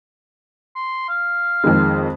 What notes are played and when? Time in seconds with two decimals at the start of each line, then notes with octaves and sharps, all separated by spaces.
0.75 C6
1.09 F5
1.64 F2 D#3 G#3